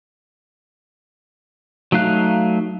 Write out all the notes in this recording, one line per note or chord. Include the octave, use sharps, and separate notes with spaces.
F#3 A3 D#4 F5 F#6